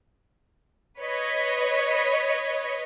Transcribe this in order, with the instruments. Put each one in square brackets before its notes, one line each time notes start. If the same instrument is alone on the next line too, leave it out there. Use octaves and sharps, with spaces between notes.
[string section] B4 C#5 D#5